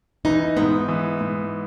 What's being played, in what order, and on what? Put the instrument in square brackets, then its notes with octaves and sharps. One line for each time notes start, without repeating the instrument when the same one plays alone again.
[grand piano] E3 [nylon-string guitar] D#4
[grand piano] G#2 [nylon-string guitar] B3
[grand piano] E3
G#2